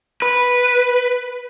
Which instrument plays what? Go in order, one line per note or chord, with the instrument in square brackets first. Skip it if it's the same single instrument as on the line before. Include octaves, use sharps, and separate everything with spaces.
[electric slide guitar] B4